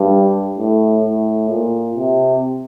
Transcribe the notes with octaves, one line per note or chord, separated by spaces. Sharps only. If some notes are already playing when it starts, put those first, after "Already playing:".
Already playing: G2
A2
A2
A#2
C3